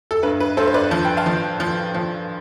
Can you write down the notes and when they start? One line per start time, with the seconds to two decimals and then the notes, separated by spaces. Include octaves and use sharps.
0.11 A4
0.23 G2 B4
0.40 B4
0.57 G2 A4 C5
0.67 C5
0.74 B4 D5
0.91 F3 A5
1.05 G5
1.17 F5 A5
1.26 F3
1.60 F3
1.95 F3